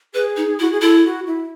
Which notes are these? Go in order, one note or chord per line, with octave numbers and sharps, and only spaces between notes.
G#4 B4
D#4
E4 F#4
G#4
E4 A4
F#4
E4